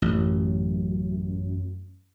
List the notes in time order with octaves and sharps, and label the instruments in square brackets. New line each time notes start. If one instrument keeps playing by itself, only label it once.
[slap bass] A1 [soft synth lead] F#2